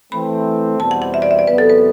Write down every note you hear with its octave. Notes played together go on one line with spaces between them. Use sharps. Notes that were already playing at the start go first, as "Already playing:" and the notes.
E3 A3 C4 B5
E2 B2 G3 C4 A5
F#5
F#5
E5
D5
E5
D5
E2 C3 F#3 B3 B4
A4
B4